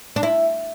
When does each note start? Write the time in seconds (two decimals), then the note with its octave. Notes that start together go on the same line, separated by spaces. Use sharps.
0.16 D4
0.23 E4